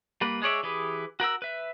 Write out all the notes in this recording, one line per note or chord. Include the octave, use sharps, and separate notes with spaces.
G3 A#3 B4
G#3 G#4 C#5 D5 E5
E3 G4 G#4 B4
F#4 A#4 F#5 E6
B4 E5